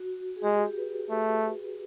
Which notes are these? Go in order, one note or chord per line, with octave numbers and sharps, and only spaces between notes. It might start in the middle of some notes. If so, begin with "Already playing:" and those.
Already playing: F#4
G#4
G#3 G4
B4
A3